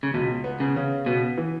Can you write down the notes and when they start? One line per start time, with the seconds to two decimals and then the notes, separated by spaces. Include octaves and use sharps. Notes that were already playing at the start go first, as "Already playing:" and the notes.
0.03 C#3
0.14 C#2 B2
0.44 B3
0.60 C#3
0.76 C#3
1.06 B2 B3
1.37 E3